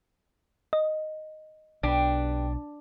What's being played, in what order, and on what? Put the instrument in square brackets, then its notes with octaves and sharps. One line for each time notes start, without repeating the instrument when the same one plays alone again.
[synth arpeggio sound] D#5
[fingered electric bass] B1 [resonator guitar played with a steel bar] D4 [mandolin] G4 B4